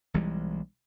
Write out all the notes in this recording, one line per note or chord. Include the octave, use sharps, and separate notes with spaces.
B1 E3 G3 G#3